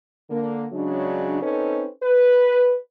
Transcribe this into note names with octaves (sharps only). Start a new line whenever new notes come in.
D3 A#3
C#3 F#3 G#3 D4
C4 C#4 D#4 A4 B4
B4